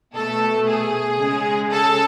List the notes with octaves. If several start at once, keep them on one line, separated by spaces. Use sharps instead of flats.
B2 A3 A4
G#4
C#3 G#3
A4